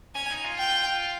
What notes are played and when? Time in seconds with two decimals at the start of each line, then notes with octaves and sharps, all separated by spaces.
0.15 C#4 G#5
0.31 D#4
0.44 F4
0.59 G5